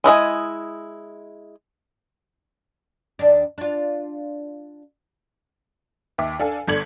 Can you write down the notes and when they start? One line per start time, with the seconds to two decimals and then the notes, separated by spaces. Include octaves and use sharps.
0.04 G#3 E4 D#5 G#5
3.19 D#2 D4
3.58 D4 F4
6.18 D#2 E5 D6
6.39 D4 A4 F5 G#5
6.67 G1 A4 D5 G#6 F#7